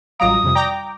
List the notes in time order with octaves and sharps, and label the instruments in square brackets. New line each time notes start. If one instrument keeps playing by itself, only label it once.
[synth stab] A1 F#3 A#5 [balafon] G3 F4 F5 [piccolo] D#6
[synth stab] F2 C3
[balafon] D5 [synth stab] G5 A#5 D6